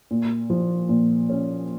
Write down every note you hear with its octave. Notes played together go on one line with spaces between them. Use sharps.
A#2
F3
A#2
C#4